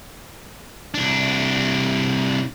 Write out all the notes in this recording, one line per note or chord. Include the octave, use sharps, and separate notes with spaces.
C2 D4